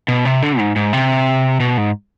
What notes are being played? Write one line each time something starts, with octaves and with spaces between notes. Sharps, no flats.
B2
C3
D3
G#2
G#2
C3
B2
G#2